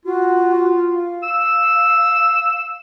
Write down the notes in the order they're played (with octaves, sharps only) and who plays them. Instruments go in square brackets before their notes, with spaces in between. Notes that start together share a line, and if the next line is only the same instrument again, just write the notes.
[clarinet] F4 [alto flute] F#4
[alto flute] F5
[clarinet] E6